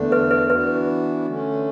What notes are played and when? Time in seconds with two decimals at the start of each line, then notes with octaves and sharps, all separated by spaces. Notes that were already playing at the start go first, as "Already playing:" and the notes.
Already playing: E2 D3 A3 D4
0.12 B4
0.31 B4
0.50 E3 B3 D4 F#4 B4
1.27 D3 A3 C#4